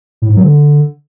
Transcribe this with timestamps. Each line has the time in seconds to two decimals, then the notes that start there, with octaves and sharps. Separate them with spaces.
0.22 A2
0.29 G#2
0.36 F#3
0.44 D3